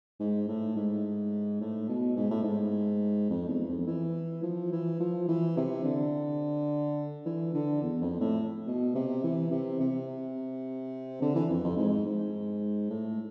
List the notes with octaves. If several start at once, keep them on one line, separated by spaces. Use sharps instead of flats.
G#2
A2
G#2
A2
B2
G#2
A2
G#2
F2
E2
E2
F2
E3
F3
E3
F3
E3
C3
D3
E3
D3
E2
F2
A2
B2
C3
E3
C3
C3
D3
E3
F2
F2
G#2
G#2
A2